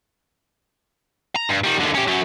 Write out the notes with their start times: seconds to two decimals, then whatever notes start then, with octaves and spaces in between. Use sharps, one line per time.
1.36 A#5
1.49 G2
1.64 D#3 G3
1.81 D#2 D3
1.95 C#4 G4
2.08 F#2 F#3